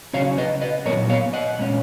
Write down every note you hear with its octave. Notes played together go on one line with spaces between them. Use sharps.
C#3 F#3 C#4 C#5 F5
B4 D#5
B4 D#5
A#2 F#3 B3 A#4 C#5
C#5 F5
D#5 F#5
A#2 G#3 C#4